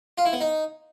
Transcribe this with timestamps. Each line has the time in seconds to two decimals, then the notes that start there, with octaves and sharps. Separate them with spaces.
0.18 F4
0.25 E4
0.33 B3
0.41 D#4